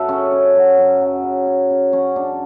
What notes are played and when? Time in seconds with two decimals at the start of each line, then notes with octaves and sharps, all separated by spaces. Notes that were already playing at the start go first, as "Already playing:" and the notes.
Already playing: F#2 F#3 A4 B4 E5 F#5
0.09 C#3 C#4
0.31 C#4
0.55 F#3
0.78 F#2
1.01 F#3
1.24 C#3
1.47 C#4
1.70 C#3
1.92 F#3 C#4
2.16 C#3 D4